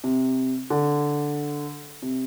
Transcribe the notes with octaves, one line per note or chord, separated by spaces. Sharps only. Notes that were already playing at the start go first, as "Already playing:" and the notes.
C3
D3
C3